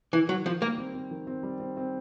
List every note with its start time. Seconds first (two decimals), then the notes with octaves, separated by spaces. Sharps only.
0.13 D#3 E3
0.29 D#3 F#3
0.45 D#3 F3
0.62 G3 A#3
0.78 C4
0.94 C4
1.11 D#3
1.27 C4
1.43 G3
1.60 C4
1.77 C4